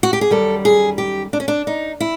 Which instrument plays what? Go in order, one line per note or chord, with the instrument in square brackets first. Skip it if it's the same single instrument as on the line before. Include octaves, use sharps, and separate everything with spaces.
[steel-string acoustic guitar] F#4
G4
G#4
F#2 D#3 G3 A4
G#4
G4
D4
C#4
D4
D#4
E4